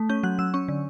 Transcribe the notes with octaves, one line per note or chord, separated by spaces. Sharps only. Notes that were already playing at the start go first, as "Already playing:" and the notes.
Already playing: A3
C#4 G6
F#3 F#6
F#3 E6
C#4 C#6
D3